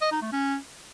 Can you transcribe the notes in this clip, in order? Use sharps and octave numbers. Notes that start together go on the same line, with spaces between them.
D#5
D#4
A3
C#4